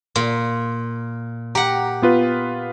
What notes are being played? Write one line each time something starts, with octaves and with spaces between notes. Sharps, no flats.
A#2
G4 F#5 A#5
B3 F4 B4